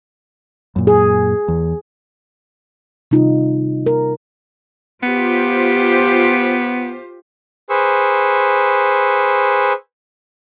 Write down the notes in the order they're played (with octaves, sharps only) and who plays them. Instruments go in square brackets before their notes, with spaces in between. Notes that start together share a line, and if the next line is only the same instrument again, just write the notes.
[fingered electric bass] F#2 A#2
[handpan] G#4
[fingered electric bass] E2
[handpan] C3 G3 D#4 F4
A#4
[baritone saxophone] B3 [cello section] F4 G4 C5
[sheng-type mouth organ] G#4 B4 C5 C#6 E6